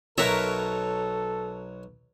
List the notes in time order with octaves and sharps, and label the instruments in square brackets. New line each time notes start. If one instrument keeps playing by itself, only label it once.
[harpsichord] B1 F#3 C#5 [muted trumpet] A4 [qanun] A#4 E5